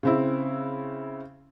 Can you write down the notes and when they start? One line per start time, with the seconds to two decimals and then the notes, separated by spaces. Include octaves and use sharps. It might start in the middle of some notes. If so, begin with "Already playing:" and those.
0.03 C#3 C4 E4